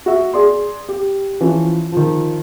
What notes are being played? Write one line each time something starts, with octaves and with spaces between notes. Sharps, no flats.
F#4 E5
G#4 D5 C6
G4
E3 F3 C#4
D#3 F3